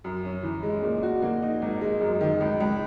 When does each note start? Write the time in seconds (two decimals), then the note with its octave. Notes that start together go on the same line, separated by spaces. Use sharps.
0.04 F#2
0.24 C#4
0.43 E3
0.63 G#3
0.82 A#2
1.03 F#4
1.22 A#3
1.42 D#4
1.62 G#1
1.81 G#3
2.00 F#2
2.21 D#3
2.41 C#2
2.60 C#2